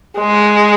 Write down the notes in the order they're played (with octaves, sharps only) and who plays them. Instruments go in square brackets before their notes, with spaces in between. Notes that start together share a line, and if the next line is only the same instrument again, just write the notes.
[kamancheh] G#3